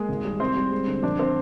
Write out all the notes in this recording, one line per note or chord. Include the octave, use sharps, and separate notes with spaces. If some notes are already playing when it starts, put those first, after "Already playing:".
Already playing: G#3 A#3 G#4
G#1
G3
C2 C4 C5
G3
G#3
D3
A#1 D4 D5
C4 C5